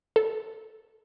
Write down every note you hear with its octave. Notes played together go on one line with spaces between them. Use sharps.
A4